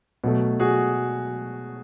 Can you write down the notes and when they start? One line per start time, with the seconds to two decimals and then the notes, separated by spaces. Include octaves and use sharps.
0.24 B2 F#3 A3
0.60 F#4 G#4